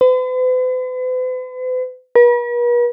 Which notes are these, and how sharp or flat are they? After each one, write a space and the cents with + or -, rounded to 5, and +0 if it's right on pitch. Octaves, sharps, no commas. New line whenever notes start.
B4 +45
B4 -45